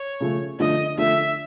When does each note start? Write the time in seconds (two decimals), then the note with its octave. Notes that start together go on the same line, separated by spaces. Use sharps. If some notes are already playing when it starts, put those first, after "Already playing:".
Already playing: C#5
0.20 C#3 F3 A3
0.59 D3 F3 A3 D#5
0.98 D3 F3 A3 E5